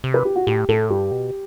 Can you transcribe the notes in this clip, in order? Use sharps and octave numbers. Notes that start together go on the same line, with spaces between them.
C3
B4
G4
F#4
A2 G4
A2 A4
G2 G4
B2